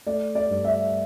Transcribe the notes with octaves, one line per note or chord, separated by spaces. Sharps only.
A3 D5
D5
G2
E5